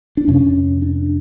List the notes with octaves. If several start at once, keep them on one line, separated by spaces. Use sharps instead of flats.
D4
F2 C3 C#4
D4